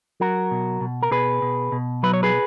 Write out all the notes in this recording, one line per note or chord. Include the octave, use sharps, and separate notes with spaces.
F#3 F#4 A#4
B2
B2
A#4
B2 G#4 B4
B2
B2
F#3 B4
C#5
G#4 B4